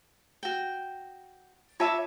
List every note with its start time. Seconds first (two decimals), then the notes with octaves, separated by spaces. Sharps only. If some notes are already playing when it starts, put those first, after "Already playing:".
0.43 F#4 G5
1.80 F4 C#5 E5 A5 D6